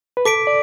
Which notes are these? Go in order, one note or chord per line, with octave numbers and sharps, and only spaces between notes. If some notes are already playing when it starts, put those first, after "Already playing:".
B4
A4 D6 B6 D7
D5